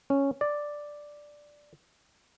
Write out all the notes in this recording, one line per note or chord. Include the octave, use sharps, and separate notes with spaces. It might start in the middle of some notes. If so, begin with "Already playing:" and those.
C#4
D5